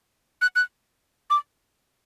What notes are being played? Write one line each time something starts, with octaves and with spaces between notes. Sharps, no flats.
F#6
F#6
D6